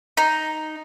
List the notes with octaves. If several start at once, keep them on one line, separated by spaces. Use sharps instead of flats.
D#4